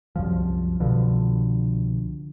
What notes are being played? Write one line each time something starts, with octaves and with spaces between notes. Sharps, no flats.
C2 F#2 F3
C2 B2 D3 F3